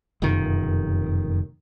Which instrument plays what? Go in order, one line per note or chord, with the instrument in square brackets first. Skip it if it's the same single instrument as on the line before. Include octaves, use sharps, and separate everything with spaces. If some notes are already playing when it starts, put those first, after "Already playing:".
[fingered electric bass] F1 F#2 B2 D#3